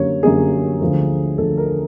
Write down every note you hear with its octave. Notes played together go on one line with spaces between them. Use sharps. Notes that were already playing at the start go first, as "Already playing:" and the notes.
Already playing: F#2 D3 G3 A#3 C#5
F#2 D3 G3 A#3 G#4
D2 D3 F3 A3
D2 D3 F3 A3 A4
A#4